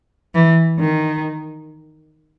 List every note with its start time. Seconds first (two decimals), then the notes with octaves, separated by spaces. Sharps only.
0.34 E3
0.80 D#3